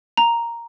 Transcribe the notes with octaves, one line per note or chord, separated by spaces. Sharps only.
A#5